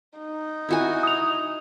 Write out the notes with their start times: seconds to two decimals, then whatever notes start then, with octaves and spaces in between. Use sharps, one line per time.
0.18 D#4
0.69 E4 F#4 G#5
1.03 D#6 F7